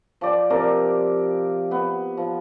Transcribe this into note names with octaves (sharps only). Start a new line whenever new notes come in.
F3 D5 G5
C3 F3 A#4 D5
B3
F3